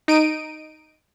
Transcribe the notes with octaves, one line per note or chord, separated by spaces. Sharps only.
D#4 D7 D#7